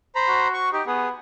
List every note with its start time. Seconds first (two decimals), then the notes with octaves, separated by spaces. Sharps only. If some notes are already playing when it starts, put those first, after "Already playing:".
0.15 C5 A#5 B5
0.28 F#4
0.54 C#6
0.73 D#4 G4
0.87 B3 G#4